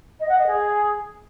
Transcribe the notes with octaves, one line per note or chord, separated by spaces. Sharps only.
D#5
F#5
D#5
G#4